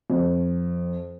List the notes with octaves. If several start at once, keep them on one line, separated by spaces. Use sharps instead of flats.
F2